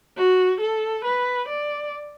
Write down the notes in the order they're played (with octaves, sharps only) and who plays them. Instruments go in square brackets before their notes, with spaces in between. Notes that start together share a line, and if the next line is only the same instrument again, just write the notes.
[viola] F#4
A4
B4
D5